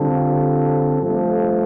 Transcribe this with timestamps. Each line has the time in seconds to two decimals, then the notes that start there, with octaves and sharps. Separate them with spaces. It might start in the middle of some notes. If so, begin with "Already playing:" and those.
Already playing: D3 G3 C4 F4 A4
1.01 G2 F3 A3